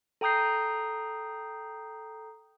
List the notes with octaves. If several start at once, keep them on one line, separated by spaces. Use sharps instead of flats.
A4 G5 A#5 D#6 G6 C7